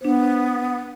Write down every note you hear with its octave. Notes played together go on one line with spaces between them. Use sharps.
B3 D4 C5